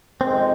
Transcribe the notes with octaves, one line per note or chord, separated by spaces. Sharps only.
F2 C3 D#3 G#3 C4